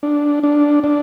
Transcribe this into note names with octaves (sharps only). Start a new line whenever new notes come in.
D4
D4
D4